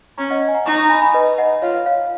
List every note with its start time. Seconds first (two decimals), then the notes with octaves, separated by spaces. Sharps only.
0.18 C#4 A#5 C#6
0.30 D#5 F#5
0.42 D#5 F#5
0.48 G#5
0.54 F#5 A#5
0.66 D#4 A#5 C#6
0.78 A#5 C#6
0.90 G#5 B5
1.02 G#5 B5
1.14 B4 D#5
1.38 D#5 F#5
1.62 F4 C#5 F5
1.86 C#5 F5